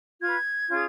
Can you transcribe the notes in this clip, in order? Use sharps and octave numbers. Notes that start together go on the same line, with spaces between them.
F4 B4 G#6
C#4 F4 G#4